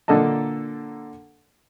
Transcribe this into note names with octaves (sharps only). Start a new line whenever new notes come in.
A#2 D3 A#3 A4 D#5 A5